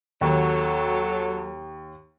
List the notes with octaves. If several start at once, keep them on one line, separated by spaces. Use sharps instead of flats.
D#2 F#3 A4